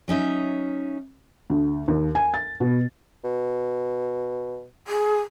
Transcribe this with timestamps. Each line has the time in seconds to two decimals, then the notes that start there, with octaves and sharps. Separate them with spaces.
0.08 F#3 C#4 D#4 E5
1.50 D2
1.88 D#2
2.15 G#5
2.34 A6
2.60 B2
3.24 B2
4.87 G#4